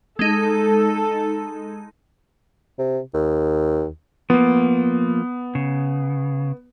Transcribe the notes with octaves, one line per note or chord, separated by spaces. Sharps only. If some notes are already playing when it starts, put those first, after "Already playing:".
G#3 D#4 A4
C3
D#2
F3 A#3 B3
C#3